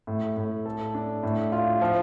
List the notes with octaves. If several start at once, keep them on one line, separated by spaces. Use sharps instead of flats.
A2
A2
A4
D4
A2
F4
F3